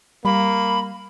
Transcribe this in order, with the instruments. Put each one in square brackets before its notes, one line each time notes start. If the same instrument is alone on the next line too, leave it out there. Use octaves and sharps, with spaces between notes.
[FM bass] G3 [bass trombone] A#3 [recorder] B5